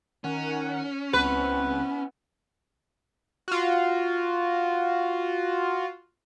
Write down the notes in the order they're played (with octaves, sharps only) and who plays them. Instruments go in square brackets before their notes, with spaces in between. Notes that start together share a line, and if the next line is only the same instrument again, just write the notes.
[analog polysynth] D#3 A#4 F#5 [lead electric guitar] C#4
[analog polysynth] C#2 C4 [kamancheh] B3 E4 [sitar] B4
[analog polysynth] F4 F#4